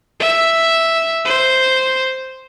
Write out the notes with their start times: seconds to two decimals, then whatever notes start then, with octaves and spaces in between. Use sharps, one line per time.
0.20 E5
1.25 C5